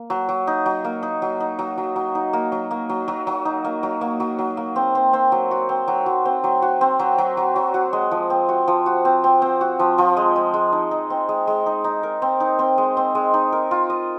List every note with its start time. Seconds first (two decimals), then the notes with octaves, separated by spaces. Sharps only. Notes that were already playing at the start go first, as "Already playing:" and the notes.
Already playing: A#3
0.10 F#3
0.29 F#3
0.47 D#4
0.66 F#3
0.84 A#3
1.03 D#4
1.22 F#3
1.40 D#4
1.59 F#3
1.78 F#3
1.96 F#3
2.15 D#4
2.33 A#3
2.52 F#3
2.71 A#3
2.89 F#3
3.08 F#3
3.27 F#3
3.45 D#4
3.64 A#3
3.83 F#3
4.01 A#3
4.20 F#3
4.39 F#3
4.57 A#3
4.76 C4
4.95 C4
5.13 C4
5.32 F#3
5.51 F#4
5.69 C4
5.88 F#3
6.06 F#3
6.25 C4
6.44 F#3
6.62 F#4
6.81 C4
6.99 F#3
7.18 F#3
7.37 F#3
7.56 F#3
7.74 F#4
7.93 G#3
8.11 F3
8.30 C4
8.49 F#4
8.68 F3
8.86 F#4
9.05 C4
9.24 C4
9.42 C4
9.61 F#4
9.79 F3
9.98 F3
10.17 G#3
10.36 G#3
10.54 G#3
10.72 D#4
10.91 D#4
11.10 C4
11.29 G#3
11.47 G#3
11.66 D#4
11.84 D#4
12.03 A#4
12.22 C4
12.40 D#4
12.59 C4
12.78 G#3
12.97 C4
13.15 G#3
13.34 D#4
13.52 A#4
13.71 F4
13.90 D#5